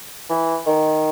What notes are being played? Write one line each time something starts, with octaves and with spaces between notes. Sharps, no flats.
E3
D#3